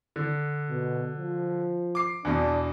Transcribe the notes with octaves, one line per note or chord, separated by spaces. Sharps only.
D3
B2
F3
D6 C7
E2 B2 D4